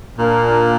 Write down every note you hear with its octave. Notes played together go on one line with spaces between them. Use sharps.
A#2 A#3 D4